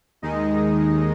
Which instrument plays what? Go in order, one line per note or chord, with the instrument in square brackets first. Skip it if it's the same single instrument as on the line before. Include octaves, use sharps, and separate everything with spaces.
[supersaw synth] D#2 D#3 G#3 D#4 D#5